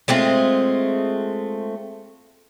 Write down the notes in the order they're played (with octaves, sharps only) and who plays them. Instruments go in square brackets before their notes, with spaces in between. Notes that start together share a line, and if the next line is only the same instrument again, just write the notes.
[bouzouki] G#3 A3 C4 F4